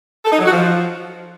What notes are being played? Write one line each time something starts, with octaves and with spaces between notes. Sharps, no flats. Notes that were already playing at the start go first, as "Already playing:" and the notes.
A4
D#4
F#3
F#4
F3